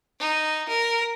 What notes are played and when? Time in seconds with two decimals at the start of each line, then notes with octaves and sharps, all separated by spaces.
0.20 D#4
0.69 A#4